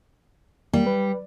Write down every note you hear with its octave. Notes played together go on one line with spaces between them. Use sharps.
G3 A#3
B4